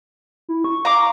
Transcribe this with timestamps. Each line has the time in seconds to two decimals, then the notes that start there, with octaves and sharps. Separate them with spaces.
0.49 E4
0.64 C#6
0.85 F5 A#5 D6